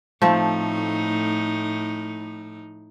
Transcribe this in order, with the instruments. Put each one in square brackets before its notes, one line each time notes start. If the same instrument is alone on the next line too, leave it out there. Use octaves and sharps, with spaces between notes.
[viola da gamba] A2 D#4 [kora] F3 A3 C4